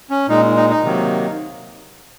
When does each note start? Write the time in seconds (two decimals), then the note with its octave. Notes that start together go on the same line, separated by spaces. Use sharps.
0.10 C#4
0.28 A#2 G#3 D#4
0.56 D#4
0.70 D#4
0.83 C3 D#3 F#3 A#3